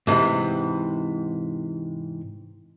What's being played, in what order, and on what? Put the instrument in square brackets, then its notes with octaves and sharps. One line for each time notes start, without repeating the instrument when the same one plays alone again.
[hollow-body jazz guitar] G#2 C3 D#3 E3